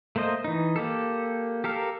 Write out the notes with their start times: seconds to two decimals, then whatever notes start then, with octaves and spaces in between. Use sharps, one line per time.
0.16 A3 A#3 C5 D#5
0.44 E3 D#4
0.76 A#3 G4 A4
1.64 G4 A4 A#4 F5